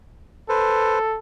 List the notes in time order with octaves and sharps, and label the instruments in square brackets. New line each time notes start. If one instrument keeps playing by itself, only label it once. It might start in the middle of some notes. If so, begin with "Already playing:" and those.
[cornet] A4 [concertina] B4 C5